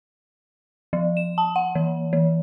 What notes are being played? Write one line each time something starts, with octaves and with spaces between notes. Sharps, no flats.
F3
E7
A5
F#5
E3
E3